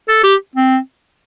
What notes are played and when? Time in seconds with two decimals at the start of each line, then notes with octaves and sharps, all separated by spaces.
0.09 A4
0.24 G4
0.56 C4